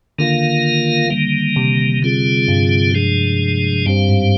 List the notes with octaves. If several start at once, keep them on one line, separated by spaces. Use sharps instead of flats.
D3 D#3 A#3 F4 A#4 F5
D#3 G3 A#3
C3
D3 G3 C4 F4 G#4
G2
C3 F3 G#3 D4 G#4
G2 G3 C4 G4 C5 F5
G#2